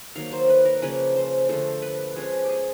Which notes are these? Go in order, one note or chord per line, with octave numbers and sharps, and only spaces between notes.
D#3 F#3 A#3 F5
C5
B4
A#4
C#3 F3 A#3 C#4 B4
C5
D3 F3 A3 C5
B4
F3 G#3 C#4 G#4
G4
G#4